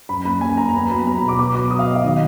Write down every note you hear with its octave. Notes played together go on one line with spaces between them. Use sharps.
F#2 B5
A#3 B5
F#2 G#5
F#2 A#5
A#5
B3 B5
F#3 B5
B3 A#5
B5
B2
D6
B3 D6
F#3 D6
F#3 D#6
F5
F#3 D#5
F5
D#3 D#5